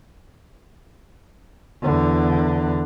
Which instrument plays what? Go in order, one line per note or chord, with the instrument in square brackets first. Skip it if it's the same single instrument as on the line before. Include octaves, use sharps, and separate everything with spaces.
[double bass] E2 D3